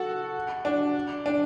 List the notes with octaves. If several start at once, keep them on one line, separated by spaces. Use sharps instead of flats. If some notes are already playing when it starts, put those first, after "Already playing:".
Already playing: F#4 A4
D4
D4